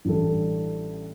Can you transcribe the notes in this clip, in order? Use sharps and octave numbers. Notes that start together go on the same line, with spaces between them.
A1 A2 G3 D4 A4